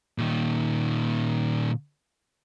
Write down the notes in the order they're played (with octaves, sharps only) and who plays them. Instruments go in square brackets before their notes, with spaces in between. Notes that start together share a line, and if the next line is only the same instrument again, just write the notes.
[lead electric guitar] A#2 D#3